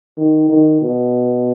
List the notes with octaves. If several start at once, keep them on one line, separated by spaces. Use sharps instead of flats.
D#3
D#3
B2